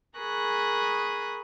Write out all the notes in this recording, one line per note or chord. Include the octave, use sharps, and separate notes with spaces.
G#4 A#4 B5 C#6 D#6 F#6